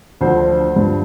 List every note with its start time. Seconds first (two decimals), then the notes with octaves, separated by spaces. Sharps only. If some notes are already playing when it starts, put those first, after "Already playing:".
0.21 D2 D3 F3 C5
0.76 G2 F3